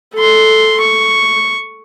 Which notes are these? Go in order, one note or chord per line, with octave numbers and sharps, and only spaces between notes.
A4 C6
C#6